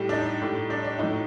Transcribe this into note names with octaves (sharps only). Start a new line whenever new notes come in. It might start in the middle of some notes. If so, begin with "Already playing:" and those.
Already playing: A2 G3 G4
D4
D#4
A2 G3
D4
D4
A2 F#3 D#4